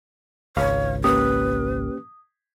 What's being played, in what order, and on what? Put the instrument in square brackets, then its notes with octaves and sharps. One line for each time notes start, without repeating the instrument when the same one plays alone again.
[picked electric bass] G#1 C#2 [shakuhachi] C#5 [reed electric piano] F5
[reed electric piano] A#3 C#4 G4 [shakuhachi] B4 [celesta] D#6